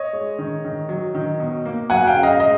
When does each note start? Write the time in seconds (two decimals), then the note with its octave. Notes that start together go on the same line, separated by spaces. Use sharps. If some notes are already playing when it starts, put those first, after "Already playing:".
Already playing: C#5 D#5
0.13 G#3
0.39 D#3
0.65 D#3
0.89 F#3
1.15 D#3
1.40 B2
1.65 A#3
1.90 F#3 F#5 G#5
2.07 F5 G5
2.15 C#3
2.23 D#5 F5
2.40 G#3 D#5 F5